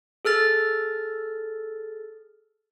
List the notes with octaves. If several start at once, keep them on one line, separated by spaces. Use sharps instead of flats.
G#4 A4 F6 A6